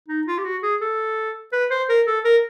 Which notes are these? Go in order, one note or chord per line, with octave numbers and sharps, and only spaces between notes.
D#4
F4
G4
F#4
G#4
A4
B4
C5
A#4
A4
A#4